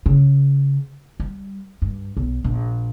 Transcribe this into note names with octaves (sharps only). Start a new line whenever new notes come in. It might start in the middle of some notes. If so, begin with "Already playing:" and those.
C#3
G3
G2
B1
A#1